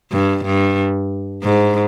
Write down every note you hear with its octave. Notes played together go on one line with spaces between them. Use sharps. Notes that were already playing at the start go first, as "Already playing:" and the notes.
G2
G2
G#2